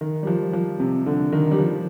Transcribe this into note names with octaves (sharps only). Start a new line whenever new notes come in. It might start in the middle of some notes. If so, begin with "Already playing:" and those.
D#3
G3
F3
F3
C3
D3
D#3
G3
F3